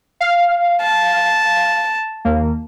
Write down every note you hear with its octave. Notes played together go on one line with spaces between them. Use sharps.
F5
A5
D#2 A#3